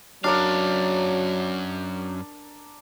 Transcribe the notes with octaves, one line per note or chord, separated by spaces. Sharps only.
F#2 F#3 D4 A#4 D5 F5